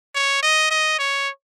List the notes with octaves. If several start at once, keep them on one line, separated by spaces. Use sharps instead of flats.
C#5
D#5
D#5
C#5